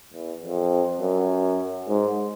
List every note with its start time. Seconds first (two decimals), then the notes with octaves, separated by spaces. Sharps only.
0.13 E2
0.42 F2
1.01 F#2
1.88 G#2